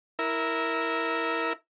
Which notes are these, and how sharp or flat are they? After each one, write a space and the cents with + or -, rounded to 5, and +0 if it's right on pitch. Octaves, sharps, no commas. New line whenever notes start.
E4 -10 A#4 +0